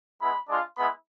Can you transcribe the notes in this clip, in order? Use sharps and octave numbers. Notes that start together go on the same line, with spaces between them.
G#3 B3 E4 B5
G#3 D4 F4
G#3 B3 E4 B5